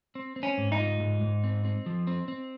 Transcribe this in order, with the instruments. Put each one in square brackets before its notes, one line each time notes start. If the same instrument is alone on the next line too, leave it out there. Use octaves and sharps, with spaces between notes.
[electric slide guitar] C4
C4
[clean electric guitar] C#4
[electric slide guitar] G#2
[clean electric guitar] D#4
[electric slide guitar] F4
G#2
G#2
C4
C4
F3
C4
C4